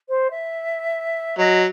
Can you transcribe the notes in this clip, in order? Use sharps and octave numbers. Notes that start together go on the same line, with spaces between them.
C5
E5
F#3 D#5